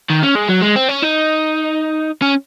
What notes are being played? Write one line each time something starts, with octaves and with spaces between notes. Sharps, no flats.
D#3
C#4
G#3
F#3
G#3
C4
C#4
D#4
C#4